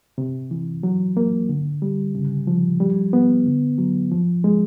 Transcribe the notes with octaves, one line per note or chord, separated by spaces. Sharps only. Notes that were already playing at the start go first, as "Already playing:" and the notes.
C3
E3
F#3
A#3
D3
G3
C#3
F3
G3
B3
D3
F#3
F3
G#3